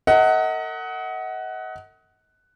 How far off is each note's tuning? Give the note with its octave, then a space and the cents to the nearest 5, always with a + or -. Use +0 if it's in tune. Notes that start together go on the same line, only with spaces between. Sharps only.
A#4 -45 D#5 +35 F#5 +10